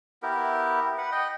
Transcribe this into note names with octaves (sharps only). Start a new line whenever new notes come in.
B3 E4 G4 A#4
B4 F#5
D#5 G5